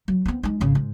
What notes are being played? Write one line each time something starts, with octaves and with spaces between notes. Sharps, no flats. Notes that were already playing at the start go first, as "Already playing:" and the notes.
F#3
B3 C4
G#3 D#4
G#1 C#3
G#2